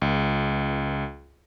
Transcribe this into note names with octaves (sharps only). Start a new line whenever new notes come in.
C#2